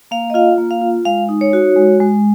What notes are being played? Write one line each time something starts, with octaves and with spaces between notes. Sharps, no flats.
A#3 F5
D#5
F4 F5
A#3
F5
F4
G#3 F5
D#4
C#5
F#4
G#3
G#3